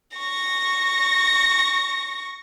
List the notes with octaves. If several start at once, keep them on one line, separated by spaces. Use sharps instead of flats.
C#6 A#6